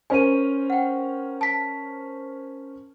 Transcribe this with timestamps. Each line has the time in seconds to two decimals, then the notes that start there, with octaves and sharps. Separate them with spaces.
0.10 C#4 A#4 C5 G#5 D#7
0.70 F#5 G5
1.41 A5 B6